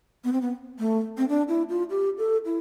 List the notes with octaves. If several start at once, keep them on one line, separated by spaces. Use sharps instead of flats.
B3
C4
B3
A3
C4
D4
E4
F4
G4
A4
E4